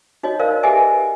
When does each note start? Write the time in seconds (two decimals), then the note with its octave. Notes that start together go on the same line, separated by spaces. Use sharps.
0.23 D#4 F#4 C#5 D#5
0.40 A#4 C5 D5 F5
0.63 G4 G#4 B4 D#5 E5 G#5